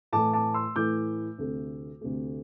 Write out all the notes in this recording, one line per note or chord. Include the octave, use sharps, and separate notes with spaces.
A2 E3 A3 A5 D6
A5 D6
C6 E6
A2 E3 A3 D6 G6
D2 C3 A3
D2 C3 A3